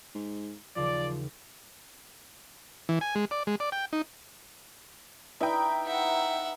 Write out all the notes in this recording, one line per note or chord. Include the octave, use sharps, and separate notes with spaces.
G#2
D#2 C#3 E3 F3 D5
E3
G#5
G#3
D5
G#3
D5
G5
D#4
D#4 E4 B4 D#5 G5
E5 F#5